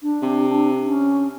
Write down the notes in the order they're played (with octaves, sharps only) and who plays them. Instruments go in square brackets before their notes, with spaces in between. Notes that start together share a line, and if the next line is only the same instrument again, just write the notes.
[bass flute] D4
[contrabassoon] C3
[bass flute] C#4